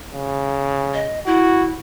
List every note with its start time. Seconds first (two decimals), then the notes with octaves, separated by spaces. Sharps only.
0.14 C#3
0.94 D#5
1.26 E4 F#4